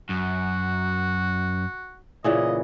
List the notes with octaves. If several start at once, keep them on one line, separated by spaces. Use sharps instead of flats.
F#2 F#4
A#2 C#3 E3 D#5